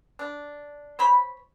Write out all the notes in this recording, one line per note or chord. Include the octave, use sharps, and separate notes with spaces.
D4
C5 C#5 B5